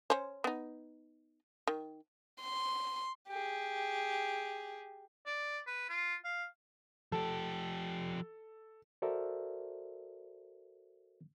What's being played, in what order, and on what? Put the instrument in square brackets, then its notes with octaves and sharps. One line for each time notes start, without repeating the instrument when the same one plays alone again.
[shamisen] C#4 C5
B3 D#4
D#3
[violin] C6
[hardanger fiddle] G4 G#4
[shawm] D5
B4
F4
F5
[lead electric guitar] F3 G4 [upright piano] A4
[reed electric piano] F#4 A4 A#4 C5 D5 E5